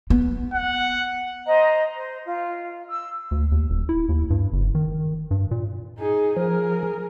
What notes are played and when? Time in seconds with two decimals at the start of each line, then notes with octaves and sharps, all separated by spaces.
0.10 B3
0.54 F#5
1.47 C5 D#5 A#5
1.96 C5
2.26 F4
2.90 E6
3.31 D2
3.52 D#2
3.70 D#1
3.89 E4
4.09 D#2
4.30 G2
4.52 F#1
4.75 D#3
5.31 G2
5.51 A#2
5.99 D#4 G#4
6.37 F3 G#4 A#4